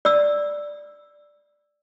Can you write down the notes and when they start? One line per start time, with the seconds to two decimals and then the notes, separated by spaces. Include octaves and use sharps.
0.05 D5 E6